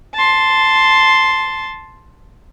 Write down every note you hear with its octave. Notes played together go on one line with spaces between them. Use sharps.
A5 C6